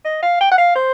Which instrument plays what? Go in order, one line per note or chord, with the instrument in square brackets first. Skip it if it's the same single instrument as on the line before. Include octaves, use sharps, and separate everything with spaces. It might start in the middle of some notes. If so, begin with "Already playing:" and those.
[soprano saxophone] D#5
F5
G5
F#5
F5
C5